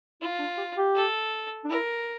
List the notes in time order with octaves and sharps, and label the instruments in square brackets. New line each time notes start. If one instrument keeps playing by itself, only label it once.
[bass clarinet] E4 [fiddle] F4
[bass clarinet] D4
G4
G4
[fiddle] A4
[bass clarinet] D4
[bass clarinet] E4 [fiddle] A#4